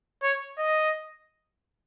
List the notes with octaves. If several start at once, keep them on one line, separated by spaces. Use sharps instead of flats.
C#5
D#5